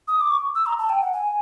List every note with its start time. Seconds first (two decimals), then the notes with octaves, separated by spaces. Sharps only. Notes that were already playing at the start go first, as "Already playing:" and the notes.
0.08 D#6
0.20 D6
0.31 C#6
0.55 E6
0.66 A#5
0.79 A5
0.89 G5
1.01 F#5
1.13 G#5